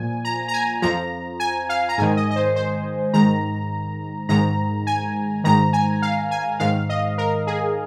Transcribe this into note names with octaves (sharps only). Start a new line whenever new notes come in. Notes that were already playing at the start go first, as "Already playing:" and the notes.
Already playing: A#2 F3 G#5
A#5
A#5
G#5
F2 F3 A#5
G#5
F5
A#5
G#2 D#3 G#5
D#5
D#5
C5
C5
G#2 D#3 A#5
G#2 D#3 A#5
G#5
G#2 D#3 A#5
G#5
F5
G#5
G#2 D#3 F5
D#5
A#4
G#4